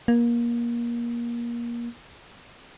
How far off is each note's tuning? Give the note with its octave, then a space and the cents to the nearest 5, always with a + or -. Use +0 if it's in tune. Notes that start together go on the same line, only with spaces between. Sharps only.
A#3 +25